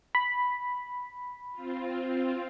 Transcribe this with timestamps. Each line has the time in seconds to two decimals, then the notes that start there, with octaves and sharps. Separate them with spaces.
0.15 B5
1.52 C4 F4